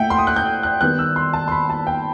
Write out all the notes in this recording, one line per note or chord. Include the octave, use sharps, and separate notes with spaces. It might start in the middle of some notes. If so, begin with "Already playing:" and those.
Already playing: A2 A3 E5 F#5 G5
C6
D#6
F#6
G6
F#6
D#3 G3 B3 F#6
E6
C6
A5
C6
B5
A5
G5